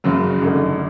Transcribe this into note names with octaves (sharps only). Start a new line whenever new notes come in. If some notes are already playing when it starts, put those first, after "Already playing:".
F#1 F#2 C#3 F#3
G#1 F#2 D3 A3